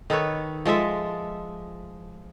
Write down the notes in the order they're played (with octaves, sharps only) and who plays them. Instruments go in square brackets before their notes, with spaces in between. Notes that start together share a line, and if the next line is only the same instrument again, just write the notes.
[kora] D#3 A4 B4 C#5
F3 G#3 A4 E5